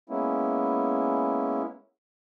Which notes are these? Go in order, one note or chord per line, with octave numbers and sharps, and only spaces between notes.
G#3 A#3 B3 C#4 E4